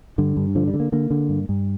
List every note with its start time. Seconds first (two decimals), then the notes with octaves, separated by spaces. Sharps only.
0.18 G2 D3
0.37 G2
0.55 D3 F3
0.68 G3
0.74 D3
0.80 A#3
0.92 D3 A#3
1.11 D3
1.29 G2
1.49 G2